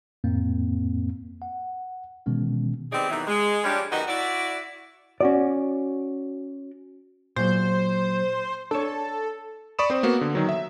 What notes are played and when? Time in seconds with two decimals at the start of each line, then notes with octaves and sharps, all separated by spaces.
0.24 F2 A2 A#3 C4
1.42 F#5
2.26 B2 D#3 E3 G#3 B3 C#4
2.92 B3 C4 D#4 G4 G#4 D5
3.10 D#2 D#3 E3 F#3 B3 E5
3.27 G#3
3.64 F3 G3 G#3 C#4 D4
3.91 F#2 D#3 B3 F#4 D#5
4.07 E4 F#4 D5
5.21 C#4 F#4 D5
7.36 A#2 F#3 C5
8.71 D4 A4 C#5
9.79 D5 B5 C#6 D#6 E7
9.90 C4 C5
10.03 A#3 B3 F#4
10.21 D3
10.35 D#3 F#3
10.49 E5